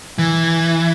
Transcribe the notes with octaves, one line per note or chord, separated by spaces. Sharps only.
E3